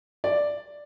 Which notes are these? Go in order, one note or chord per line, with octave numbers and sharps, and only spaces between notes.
D5